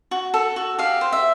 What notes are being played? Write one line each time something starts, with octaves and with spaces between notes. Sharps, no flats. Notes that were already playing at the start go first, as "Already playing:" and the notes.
F#4
A4
F#4
G4 F5
C5
E5